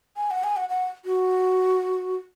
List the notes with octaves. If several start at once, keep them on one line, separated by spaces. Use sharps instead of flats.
G#5
F#5
G#5
F#5
F#5
F#4